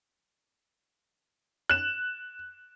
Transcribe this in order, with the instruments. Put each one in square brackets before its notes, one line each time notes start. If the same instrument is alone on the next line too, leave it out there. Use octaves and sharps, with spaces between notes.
[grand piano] F#6 E7